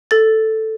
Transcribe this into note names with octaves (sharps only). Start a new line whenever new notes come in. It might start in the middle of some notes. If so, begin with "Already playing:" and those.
A4 A6